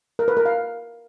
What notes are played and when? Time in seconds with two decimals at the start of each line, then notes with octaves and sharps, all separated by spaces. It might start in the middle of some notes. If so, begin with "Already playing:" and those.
0.19 A#4
0.28 B4
0.37 A#4
0.46 F5